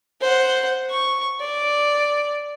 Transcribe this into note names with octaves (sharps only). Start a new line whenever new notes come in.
C5 F#5
C#6
D5